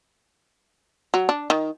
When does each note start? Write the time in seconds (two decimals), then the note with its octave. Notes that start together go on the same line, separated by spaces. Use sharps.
1.14 F#3
1.29 D4
1.50 D#3